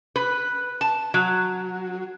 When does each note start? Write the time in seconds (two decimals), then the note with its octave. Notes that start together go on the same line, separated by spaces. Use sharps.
0.16 B4
0.81 A5
1.14 F#3